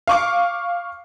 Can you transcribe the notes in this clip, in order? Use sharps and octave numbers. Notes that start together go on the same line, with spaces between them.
F5 C#6 D6